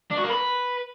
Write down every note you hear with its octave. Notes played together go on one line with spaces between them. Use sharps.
D4
F#4
A#3
B4